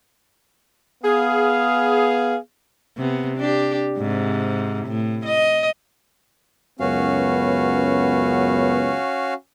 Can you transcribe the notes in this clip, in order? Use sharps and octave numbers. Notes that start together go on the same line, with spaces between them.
B3 G#4 F5
C3 B3
D4 G4
G#2 C3
A2
D#5
C#2 F#2 B3 C#4 F#4 F5